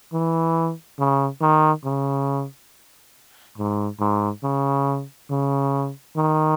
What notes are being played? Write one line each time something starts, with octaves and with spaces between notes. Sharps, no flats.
E3
C#3
D#3
C#3
G#2
G#2
C#3
C#3
D#3